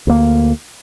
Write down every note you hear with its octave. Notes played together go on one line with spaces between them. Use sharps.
D2 A#3